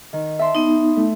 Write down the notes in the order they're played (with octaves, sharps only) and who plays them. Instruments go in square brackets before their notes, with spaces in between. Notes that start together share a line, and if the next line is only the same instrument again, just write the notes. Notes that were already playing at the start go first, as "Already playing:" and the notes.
[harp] D#3
E5 A5 C6
[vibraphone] B3 D#4
[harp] A3